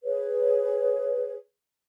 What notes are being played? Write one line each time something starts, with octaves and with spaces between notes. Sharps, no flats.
G#4 B4 C#5